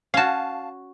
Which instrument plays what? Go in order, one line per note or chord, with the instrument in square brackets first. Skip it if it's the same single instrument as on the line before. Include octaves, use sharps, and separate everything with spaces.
[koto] C#4 F#4 [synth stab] F5 A5